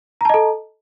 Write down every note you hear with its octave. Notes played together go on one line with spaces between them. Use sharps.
A4 D#5 A5 A#5